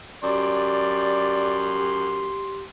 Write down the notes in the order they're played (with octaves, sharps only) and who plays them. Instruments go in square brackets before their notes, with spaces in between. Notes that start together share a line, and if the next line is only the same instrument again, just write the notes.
[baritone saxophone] F#2 [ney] G4 [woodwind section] D5 [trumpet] C6